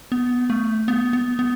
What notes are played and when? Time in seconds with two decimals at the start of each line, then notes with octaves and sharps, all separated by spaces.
0.12 B3
0.50 A3
0.88 B3
1.13 B3
1.39 B3